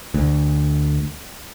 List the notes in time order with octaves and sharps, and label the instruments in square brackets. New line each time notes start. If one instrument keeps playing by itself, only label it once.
[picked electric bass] D2